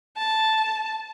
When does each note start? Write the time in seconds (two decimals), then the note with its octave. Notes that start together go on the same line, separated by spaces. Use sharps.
0.17 A5